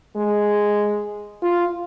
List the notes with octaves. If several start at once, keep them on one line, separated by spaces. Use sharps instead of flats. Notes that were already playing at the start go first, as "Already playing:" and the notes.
G#3
F4